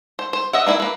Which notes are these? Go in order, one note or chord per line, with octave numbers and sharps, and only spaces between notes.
C5
C5
D#5 E5 F#5
A#3 D#4 E4 E5 B5
A#3 B4